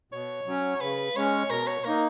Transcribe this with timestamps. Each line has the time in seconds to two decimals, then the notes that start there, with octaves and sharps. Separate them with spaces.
0.12 B2 C#5
0.46 F#3 C#4
0.81 C#3 B4
1.16 G#3 C#4 C#5
1.50 B2 A#4
1.67 C#5
1.85 A#3 D#4 A#4